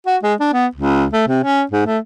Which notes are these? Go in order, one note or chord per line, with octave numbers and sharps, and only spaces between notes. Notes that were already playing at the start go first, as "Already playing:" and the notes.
F#4
G#3
D4
B3
C#2
A3
C3
C#4
G#2
A3